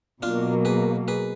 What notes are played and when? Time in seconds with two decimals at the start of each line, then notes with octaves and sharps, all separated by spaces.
0.22 B2 F#3 A#3 D4 F4
0.65 G#4 B4
1.08 G#4 B4